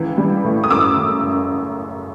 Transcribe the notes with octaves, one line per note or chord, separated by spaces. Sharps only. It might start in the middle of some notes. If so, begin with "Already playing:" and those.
Already playing: C#2 E3
G3
A2
D#6
F#2 D6 E6
C#3
F#1